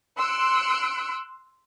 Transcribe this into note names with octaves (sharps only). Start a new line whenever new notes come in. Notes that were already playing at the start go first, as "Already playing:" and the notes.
C6 E6 F#6 C#7 D7